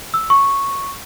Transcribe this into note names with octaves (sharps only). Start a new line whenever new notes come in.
E6
C#6